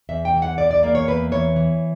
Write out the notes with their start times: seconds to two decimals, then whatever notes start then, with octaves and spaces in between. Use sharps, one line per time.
0.09 E2 E5
0.25 G5
0.34 E3
0.42 F#5
0.58 E2 D5
0.71 D5
0.83 A#3 D5
0.95 C#5
1.08 E2 B4
1.32 E3 C#5
1.56 E3